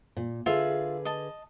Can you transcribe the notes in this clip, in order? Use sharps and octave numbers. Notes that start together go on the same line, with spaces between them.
A#2
D3 F4 G#4 B4 E5
D#5 A5